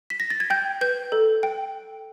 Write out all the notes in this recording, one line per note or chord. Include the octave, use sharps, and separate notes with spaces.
B6
A#6
A6
G#6
G5 G6
B4 G6
A4
G5